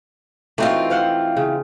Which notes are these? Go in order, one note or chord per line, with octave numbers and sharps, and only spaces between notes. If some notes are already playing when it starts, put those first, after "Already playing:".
E3 A3 C4 D#4 F4 F#4
C5 F5 F#5
C#3